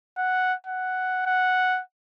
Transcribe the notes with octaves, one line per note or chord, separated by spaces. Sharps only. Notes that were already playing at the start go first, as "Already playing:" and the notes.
F#5
F#5
F#5